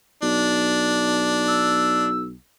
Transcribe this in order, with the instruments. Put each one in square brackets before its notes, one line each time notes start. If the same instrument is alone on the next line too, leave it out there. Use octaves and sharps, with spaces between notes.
[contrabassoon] B1 [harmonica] D4
[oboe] E6